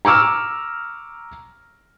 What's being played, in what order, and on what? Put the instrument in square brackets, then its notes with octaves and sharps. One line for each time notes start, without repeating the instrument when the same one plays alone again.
[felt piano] A#5 C#6 D6 E6 F6